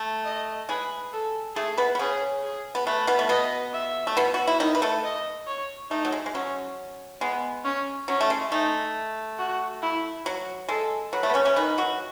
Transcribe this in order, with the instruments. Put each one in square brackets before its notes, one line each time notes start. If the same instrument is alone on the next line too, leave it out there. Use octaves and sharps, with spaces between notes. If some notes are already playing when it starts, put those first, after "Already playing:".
Already playing: [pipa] A3
[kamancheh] D#5
[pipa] G#3 G#4 [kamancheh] B4
[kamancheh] A4
[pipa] A3 A4 [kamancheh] G#4
[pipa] B3 B4
B3
[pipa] C#3 C#4 [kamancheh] G#4
[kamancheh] G#4
[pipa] B3
[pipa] A3 [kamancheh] B4
[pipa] B2 B3
A3
[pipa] B2 B3 [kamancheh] D#5
[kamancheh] E5
[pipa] A3
B2 B3
F#4
E4
D#3 D#4
B4
A3 A4
[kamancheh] D#5
C#5
[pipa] A3 [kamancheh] D#4
[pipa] F#3
G#3
G#3
[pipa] F#3 [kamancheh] C#4
[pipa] G#3 [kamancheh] B3
[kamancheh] C#4
[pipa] F#3 [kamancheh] C#4
[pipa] A3
G#3
[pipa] A3 [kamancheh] D#4
[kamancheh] F#4
E4
[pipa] F#3 [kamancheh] F#4
[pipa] G#3 [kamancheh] A4
[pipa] F#3 [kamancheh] B4
[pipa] A3
B3
C#3 C#4
C#3 C#4
[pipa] D#3 D#4 [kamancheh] B4
[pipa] F#3 F#4